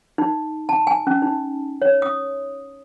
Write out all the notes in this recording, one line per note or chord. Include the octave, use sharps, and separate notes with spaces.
D#4
A5
G#5
C#4
D#4
C#5
D#6